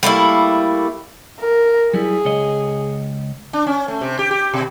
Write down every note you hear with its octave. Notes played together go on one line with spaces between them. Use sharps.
G3 A3 A#3 E4
A#4
F#3 G3 E4 G#4
C#2 C#5 D#5
D4
C#4
A3
C3
G4
G4
B2